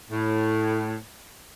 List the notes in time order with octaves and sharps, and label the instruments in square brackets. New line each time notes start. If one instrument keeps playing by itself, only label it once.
[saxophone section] A2